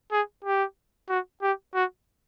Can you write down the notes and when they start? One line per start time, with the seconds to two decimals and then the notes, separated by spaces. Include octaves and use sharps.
0.12 G#4
0.44 G4
1.09 F#4
1.42 G4
1.75 F#4